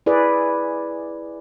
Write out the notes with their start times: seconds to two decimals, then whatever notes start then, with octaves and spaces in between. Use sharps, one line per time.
0.06 E4 G#4 B4 D5